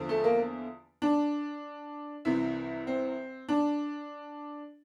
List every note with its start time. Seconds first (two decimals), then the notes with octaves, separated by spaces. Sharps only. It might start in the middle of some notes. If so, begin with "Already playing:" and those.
Already playing: E2 D3 F3
0.09 A3
0.24 A#3
1.02 D4
2.25 C2 C3 E3 E4
2.87 C4
3.49 D4